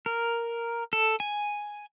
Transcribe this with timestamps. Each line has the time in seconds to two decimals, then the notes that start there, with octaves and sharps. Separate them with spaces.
0.06 A#4
0.93 A4
1.20 G#5